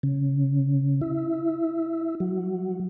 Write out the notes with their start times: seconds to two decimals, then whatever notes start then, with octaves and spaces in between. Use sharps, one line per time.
0.03 C#3
1.01 E4
2.20 F#3